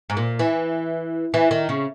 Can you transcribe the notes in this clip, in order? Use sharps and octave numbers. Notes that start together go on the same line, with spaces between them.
G#2
A#2
E3
E3
D#3
C#3